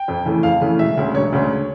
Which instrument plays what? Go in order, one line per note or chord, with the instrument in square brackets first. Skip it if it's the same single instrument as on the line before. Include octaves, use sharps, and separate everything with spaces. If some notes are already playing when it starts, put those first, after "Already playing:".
Already playing: [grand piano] G5
F2
C#3 E3 A3
F2 F5
C#3 E3 A3
E1 E5
D2 C#3
E1 C#5
D2 C#3